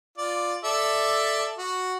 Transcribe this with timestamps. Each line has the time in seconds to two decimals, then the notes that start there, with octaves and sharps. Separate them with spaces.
0.18 F4 D5
0.64 A4 D5 E5
1.58 F#4